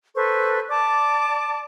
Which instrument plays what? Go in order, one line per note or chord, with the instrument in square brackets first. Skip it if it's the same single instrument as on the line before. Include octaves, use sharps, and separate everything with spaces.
[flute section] A4 B4 C5 C#6
D5 A5 D6